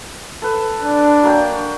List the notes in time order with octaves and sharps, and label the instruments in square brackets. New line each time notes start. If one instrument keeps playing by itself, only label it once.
[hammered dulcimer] A4 B4
[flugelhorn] D4
[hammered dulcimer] F#3 A#3 G5